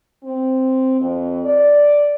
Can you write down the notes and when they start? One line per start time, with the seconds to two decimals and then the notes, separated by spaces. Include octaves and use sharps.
0.23 C4
1.00 F2
1.45 D5